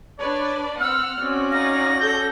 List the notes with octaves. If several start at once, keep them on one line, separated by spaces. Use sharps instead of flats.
D4 B4 C#5 D5
C4 F#5 E6 F6
C4 C#4 F#4 D5 E6
D#4 F5 A#6
A4 G6